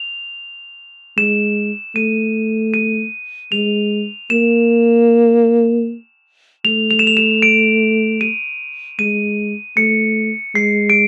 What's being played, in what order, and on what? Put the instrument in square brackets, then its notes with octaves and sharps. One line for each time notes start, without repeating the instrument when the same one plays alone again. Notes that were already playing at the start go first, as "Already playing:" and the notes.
Already playing: [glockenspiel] F7
[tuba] G#3 [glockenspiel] E7
[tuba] A3 [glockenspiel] D#7
[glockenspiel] D#7
[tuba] G#3 [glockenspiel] F7
[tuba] A#3 [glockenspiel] E7
[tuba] A3 [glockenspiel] F7
[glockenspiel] F7
E7
F7
E7
D7
D#7
[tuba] G#3 [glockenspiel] D#7
[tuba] A3 [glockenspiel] C#7
[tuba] G#3 [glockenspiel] C7
[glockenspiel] D7